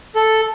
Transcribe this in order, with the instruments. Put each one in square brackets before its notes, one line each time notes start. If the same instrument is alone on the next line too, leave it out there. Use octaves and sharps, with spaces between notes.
[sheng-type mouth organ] A4